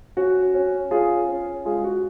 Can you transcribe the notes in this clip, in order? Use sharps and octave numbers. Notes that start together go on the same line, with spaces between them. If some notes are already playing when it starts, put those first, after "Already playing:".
C#4 F#4
C#4
C#4 F4 G#4
C#4
G#3 F4 G#4
F#4